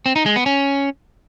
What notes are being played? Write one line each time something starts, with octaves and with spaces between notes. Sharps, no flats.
C4
D#4
G#3
B3
C#4